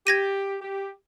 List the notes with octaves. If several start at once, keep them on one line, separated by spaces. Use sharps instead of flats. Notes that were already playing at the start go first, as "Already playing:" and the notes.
G4 G#6 A#6 D#7
G4